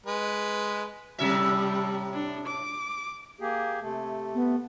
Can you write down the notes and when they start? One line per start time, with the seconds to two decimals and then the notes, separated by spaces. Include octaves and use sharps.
0.06 G#3 B4
1.19 A2 C3 G3 E5
2.13 D4
2.47 D6
3.40 A#3 G4 G#4
3.82 C3 A3
4.34 B3